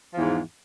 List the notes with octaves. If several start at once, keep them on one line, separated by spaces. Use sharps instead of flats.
E2 G#2 F3